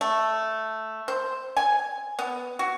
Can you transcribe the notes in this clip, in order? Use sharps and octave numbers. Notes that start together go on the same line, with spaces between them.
A3
C5
G#5
B3
F#4